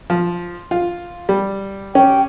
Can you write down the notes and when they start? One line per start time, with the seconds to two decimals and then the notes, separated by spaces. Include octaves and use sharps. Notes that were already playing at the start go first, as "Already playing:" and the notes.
0.10 F3
0.71 F4
1.29 G3
1.95 C#4 G4 G5